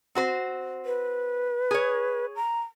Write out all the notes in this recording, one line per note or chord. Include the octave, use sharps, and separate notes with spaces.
C4 F#4 C5
B4
G#4 C#5
A#5